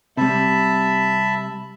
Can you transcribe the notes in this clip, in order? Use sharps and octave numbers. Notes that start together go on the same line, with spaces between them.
C3 G3 E5 A5 B5